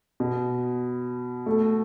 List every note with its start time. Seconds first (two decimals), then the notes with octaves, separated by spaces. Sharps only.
0.20 B2
1.46 A3